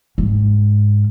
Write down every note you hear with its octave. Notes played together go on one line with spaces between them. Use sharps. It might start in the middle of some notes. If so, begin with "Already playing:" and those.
G#2